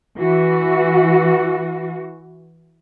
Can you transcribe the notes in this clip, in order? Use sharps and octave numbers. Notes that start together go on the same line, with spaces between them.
E3 F#4